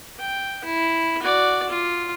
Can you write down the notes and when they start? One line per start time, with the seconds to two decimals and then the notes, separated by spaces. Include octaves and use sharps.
0.19 G5
0.64 E4
1.22 F#4 D5
1.69 F4